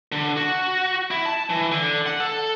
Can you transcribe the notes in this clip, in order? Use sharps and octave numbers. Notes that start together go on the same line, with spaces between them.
D3
F#4
E4
A5
E3
D3
F#5
A4